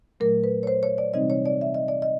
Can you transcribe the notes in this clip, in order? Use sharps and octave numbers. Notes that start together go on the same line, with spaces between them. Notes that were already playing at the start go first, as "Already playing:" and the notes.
A#2 F#3 A3 A#4
B4
C#5
C5
C#5
D5
C3 E3 G3 C4 D#4 D#5
C#5
D5
E5
D#5
D5
D#5